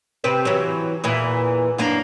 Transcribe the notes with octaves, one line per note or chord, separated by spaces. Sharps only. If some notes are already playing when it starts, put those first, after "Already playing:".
C3 C4 B4
E3 F#3
E2 A#2 E3
F#2 A#3 D4